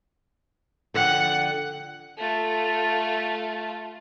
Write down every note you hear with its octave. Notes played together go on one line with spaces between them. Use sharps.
D3 F3 F#5 G5
A3 F4